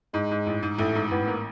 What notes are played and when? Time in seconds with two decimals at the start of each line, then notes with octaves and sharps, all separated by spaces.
0.14 G#2 G#3
0.31 G#2
0.47 A1
0.63 G#2
0.79 A1 A3
0.95 G#2
1.11 A1 B3
1.28 A#3